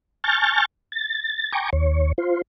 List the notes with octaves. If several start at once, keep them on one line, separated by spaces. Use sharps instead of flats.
G#5 A5 C#6 F6 G6 A6
A6
G5 G#5 A#5 C#6 D6
D#2 C#5
F4 C5